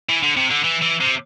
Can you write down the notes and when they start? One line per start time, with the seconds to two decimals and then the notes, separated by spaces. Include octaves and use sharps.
0.09 E3
0.23 D3
0.36 C3
0.50 D3
0.64 E3
0.82 E3
1.01 C3